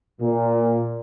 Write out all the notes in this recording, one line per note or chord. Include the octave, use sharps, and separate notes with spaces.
A#2